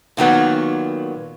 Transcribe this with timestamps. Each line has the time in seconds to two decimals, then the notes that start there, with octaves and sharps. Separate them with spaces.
0.17 A#2 D#3 F#3 B3